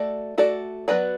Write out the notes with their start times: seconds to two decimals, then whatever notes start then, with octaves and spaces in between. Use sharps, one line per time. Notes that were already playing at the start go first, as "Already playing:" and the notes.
Already playing: A3 F#4 A4 D5
0.38 A3 F#4 A4 D5
0.88 F#3 B3 F#4 B4 D5